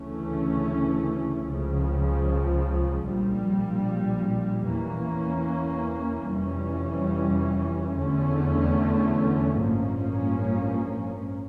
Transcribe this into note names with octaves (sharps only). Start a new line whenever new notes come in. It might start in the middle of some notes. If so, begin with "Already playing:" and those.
Already playing: D2 C#3 E3 A3 C#4
C#2 C#3 F3
A#1 A#2 G3
E2 E3 A#3 C#4
F1 F2 E3 G3 C#4
E2 D3 A3 C#4
A1 G2 F3 A#3 C#4